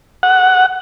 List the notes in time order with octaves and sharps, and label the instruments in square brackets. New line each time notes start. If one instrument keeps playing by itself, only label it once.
[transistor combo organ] F#5